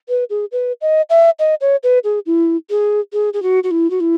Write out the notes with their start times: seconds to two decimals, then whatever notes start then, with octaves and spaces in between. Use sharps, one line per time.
0.09 B4
0.30 G#4
0.52 B4
0.81 D#5
1.10 E5
1.39 D#5
1.61 C#5
1.83 B4
2.04 G#4
2.26 E4
2.70 G#4
3.13 G#4
3.33 G#4
3.43 F#4
3.63 F#4
3.71 E4
3.90 F#4
4.00 E4